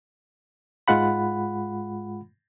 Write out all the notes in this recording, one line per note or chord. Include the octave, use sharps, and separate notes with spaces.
G#2 G#3 F4 F#5 B5